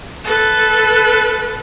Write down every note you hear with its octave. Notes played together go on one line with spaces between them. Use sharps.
A4 B4